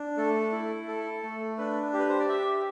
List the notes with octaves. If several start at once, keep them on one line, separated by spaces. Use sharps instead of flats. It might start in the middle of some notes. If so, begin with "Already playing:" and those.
Already playing: D4
A3 A4
E4
A4
A3
D4 B4
G4
B4
C5
D5
G4 E5